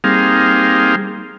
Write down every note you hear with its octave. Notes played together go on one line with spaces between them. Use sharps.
G3 A#3 C4 D#4 G#4 F5